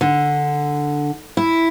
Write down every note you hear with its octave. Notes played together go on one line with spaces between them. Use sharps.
D3
E4